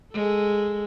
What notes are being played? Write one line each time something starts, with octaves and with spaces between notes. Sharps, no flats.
G#3 A4